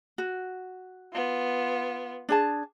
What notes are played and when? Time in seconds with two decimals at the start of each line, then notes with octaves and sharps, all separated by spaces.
0.18 F#4
1.13 B3 F4
2.29 D4 G#4 A5